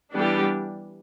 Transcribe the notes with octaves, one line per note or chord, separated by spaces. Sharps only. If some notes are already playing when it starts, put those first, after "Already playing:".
E3 G3 B3 D4 G4